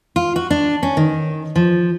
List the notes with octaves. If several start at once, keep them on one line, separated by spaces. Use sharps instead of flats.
F4
F#4
D4
C#4
D#3
F3